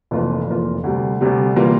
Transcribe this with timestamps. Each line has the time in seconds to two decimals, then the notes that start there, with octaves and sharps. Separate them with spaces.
0.11 F1 F2 E3 A#3 F4
0.47 F1 F2 E3 A#3 F4
0.84 D2 C3 G3
1.21 D2 C3 G3
1.56 C3 E3 G3 A#3 F4